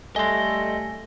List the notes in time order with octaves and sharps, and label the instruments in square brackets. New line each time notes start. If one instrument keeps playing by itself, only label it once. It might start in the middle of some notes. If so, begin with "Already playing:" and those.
[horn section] G3 A3 [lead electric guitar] D#5 C6 [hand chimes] G#5 A#6